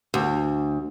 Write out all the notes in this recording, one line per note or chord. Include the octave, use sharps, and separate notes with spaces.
D2